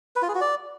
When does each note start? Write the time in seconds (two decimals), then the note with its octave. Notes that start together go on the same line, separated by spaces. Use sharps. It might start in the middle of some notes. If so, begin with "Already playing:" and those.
0.16 B4
0.22 F4
0.28 G#4
0.35 F#4
0.41 D5